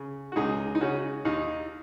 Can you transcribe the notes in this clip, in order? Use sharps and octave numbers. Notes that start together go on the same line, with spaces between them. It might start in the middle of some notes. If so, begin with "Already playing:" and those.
Already playing: C#3
F#4
C#2 D#4 G#4
D#4
C#3 C#4 F#4
D#2 D#4